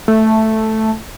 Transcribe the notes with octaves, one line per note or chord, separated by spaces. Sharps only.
A3